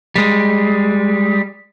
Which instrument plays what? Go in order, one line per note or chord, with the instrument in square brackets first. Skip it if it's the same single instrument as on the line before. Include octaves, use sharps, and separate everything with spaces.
[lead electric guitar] G3 G#3